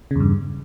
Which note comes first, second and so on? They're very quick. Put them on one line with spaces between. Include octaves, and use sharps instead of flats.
C#3 E2 G2